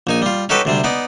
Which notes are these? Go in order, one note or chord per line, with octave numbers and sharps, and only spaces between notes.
A#1 D#4 G#5
G3 F4
C#4 D#4 F#4 G4 A4 B4
D2 C3 G3
B3 D#4 D5